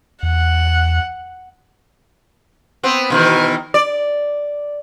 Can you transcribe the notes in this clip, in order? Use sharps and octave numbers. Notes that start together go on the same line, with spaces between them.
E2 F#5
B3 C4
B2 D#3 E3
D5